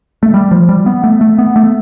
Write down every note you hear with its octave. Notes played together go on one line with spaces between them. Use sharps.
A3
G3
F3
G3
B3
A3
A3
B3
A3